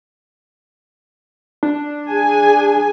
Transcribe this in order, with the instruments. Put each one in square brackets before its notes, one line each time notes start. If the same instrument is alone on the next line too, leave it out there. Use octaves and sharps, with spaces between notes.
[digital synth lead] D4
[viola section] G#4 G#5